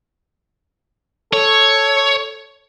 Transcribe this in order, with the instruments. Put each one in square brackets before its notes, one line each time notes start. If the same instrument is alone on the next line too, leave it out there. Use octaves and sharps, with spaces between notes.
[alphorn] A4 [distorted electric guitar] C#5